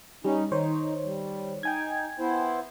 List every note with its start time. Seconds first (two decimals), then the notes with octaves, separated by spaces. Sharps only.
0.25 G3 C#4 D#4
0.52 D#3 D#4 C5 C#5
1.05 G3
1.63 D#4 G5 G#5 G#6
2.19 B3 E4 C5